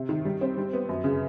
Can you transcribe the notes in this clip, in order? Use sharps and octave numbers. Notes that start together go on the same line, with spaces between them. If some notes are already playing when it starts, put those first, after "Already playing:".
Already playing: C3
D#3
G3
C4
G3
B3
F#2
C#3